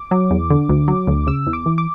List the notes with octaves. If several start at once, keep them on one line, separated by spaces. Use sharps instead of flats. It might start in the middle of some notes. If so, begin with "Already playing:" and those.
Already playing: D6
F#3
E2
D3
D2
F#3
D2
C#3 E6
E2
D6
E3
D6